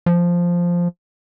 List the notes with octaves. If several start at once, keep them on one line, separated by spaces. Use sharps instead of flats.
F3